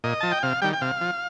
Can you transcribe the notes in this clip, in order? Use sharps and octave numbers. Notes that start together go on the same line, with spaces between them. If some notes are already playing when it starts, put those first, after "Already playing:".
A#2 D#5
F3 A5
G5
C3 F5
D#3 G3 G5
G5
C3 F5
F3